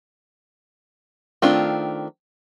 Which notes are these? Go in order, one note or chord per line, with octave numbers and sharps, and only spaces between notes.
D#3 A3 C4 D4 F4